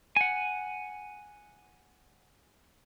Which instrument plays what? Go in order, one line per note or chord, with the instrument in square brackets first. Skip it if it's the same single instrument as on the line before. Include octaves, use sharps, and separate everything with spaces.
[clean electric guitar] F#5 G#5